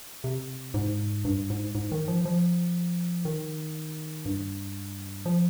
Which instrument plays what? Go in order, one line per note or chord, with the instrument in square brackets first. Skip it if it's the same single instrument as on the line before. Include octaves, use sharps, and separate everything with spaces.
[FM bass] C3
G#2
G2
G#2
G#2
D#3
F3
F3
D#3
G2
F3